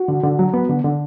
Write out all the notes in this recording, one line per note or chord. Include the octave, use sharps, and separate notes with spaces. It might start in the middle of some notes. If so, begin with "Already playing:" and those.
Already playing: F#4
D3
D3
F#3
B3
D3
D3